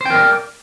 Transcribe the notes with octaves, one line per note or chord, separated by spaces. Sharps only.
A#4 C5 D5 G5